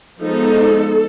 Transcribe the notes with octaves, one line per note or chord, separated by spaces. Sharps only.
F3 G#3 B3 D#4 A4